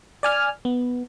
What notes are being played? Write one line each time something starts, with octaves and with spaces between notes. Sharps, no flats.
D5 G#5 F6
B3